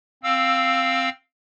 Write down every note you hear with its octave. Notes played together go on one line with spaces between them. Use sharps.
C4 F5 E6